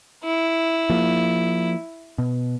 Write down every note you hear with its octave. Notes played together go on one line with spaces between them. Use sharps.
E4
F3 A#3
B2